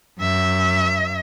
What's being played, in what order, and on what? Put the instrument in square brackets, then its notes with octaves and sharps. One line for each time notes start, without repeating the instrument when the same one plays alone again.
[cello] F#2 E5